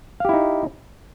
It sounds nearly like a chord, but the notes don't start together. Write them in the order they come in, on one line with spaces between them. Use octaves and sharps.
F5 G4 E4 D#4